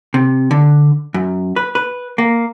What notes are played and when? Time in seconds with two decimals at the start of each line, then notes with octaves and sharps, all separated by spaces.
0.14 C3
0.51 D3
1.14 F#2
1.56 B4
1.75 B4
2.18 A#3